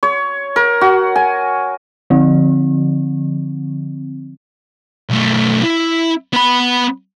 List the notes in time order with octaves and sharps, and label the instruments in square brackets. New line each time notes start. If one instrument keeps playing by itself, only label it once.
[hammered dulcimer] C#5
A#4
F#4
G#5
[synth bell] D3 F3 C4
[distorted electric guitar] B1 A3
E4
B3 B5